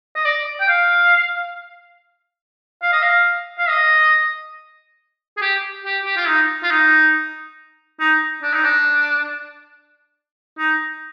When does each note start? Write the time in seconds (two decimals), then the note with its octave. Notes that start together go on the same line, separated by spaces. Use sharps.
0.16 D#5
0.25 D5
0.61 G5
0.68 F5
2.83 F5
2.93 D#5
3.03 F5
3.59 F5
3.69 D#5
5.37 G#4
5.42 G4
5.85 G4
6.05 G4
6.16 F4
6.28 D#4
6.63 F4
6.70 D#4
8.00 D#4
8.43 D4
8.54 D#4
8.65 D4
10.58 D#4